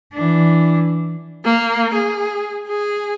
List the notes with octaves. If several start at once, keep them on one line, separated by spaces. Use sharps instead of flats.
E3 D4
A#3
G#4
G#4